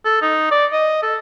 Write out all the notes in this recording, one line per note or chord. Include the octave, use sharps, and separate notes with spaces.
A4
D#4
D5
D#5
A4